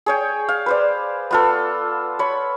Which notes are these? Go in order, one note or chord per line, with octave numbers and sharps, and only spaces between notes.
G#4 C#5 G5
F5
B4 C5 D5
B3 F4 A4
C#5 B5